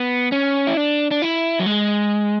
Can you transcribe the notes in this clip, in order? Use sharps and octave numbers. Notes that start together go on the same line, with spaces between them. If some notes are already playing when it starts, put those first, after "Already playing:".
Already playing: B3
C#4
E4
D4
D4
E4
F#3
G#3